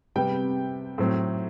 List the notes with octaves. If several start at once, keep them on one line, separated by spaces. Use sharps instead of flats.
C3 G3 B3 G5
A2 F#3 C4